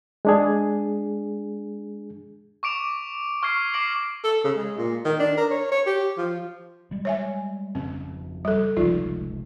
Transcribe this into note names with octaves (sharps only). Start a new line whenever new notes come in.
G#3 D4 G#4
C#6 D6 D7 F7
C#6 F6 G#6 C7
D6 A#6 C7 D7 F#7
A4
C#3
G#3
A#2
D#3
D4
A#4
C#5
C#5
G4
F3
G3 G#3
C#5 E5 G#5
F2 C#3 C4 C#4
G3 A4
F1 C#2 F3 D#4 F4